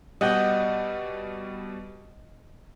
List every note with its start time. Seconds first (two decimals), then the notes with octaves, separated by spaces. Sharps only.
0.21 B2 G3 D#5 F#5 G5